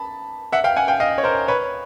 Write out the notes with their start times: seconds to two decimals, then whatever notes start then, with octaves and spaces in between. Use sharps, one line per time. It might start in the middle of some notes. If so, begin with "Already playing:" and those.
Already playing: A5 B5
0.52 E5 F#5
0.64 F5 G5
0.76 F#5 G#5
0.88 F5 G5
1.00 D#5 F5
1.18 C#5
1.23 A#4 C5
1.48 B4 C#5